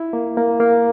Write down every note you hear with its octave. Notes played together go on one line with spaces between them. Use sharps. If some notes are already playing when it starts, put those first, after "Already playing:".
Already playing: E4
A#3
A#3
A#3